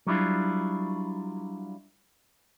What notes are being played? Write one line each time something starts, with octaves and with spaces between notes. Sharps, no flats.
F#3 G3 D4 E4 F4